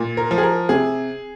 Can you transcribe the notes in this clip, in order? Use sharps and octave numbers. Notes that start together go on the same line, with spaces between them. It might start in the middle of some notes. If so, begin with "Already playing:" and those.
Already playing: A#2
A#4
F3
G#4
A#4
C3 G#4